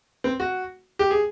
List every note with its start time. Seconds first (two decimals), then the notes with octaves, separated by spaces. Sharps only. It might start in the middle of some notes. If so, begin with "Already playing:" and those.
0.24 C4
0.40 F#4
0.99 G4
1.11 G#4